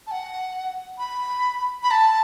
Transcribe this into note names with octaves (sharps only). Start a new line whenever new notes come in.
A5
F#5
B5
B5
A5